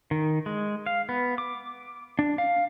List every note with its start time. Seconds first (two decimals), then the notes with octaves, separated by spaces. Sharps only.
0.11 D#3
0.46 G#3
0.86 F5
1.09 B3
1.38 D6
2.19 D4
2.38 F5